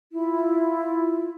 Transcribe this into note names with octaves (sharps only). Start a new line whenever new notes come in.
E4 F4